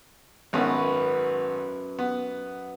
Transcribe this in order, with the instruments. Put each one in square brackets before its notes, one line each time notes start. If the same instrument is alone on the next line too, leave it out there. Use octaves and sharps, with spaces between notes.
[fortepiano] G#1 B3 C#4 [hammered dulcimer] F#2 B4
[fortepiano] B3